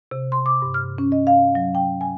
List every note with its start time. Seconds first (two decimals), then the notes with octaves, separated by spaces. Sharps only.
0.11 C3
0.32 C6
0.46 D6
0.62 G2
0.74 F6
0.98 C#4
1.12 D#5
1.27 F5
1.55 F#3
1.75 G5
2.01 G#5